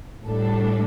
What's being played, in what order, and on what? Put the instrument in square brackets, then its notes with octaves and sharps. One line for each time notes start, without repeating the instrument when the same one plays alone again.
[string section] A2 G3 D4 A4